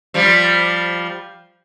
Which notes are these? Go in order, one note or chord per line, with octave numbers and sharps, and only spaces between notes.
F3 G3